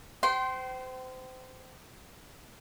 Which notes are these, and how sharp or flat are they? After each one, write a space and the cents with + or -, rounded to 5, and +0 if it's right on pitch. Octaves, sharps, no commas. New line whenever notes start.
C5 -25 G5 -35 C6 +0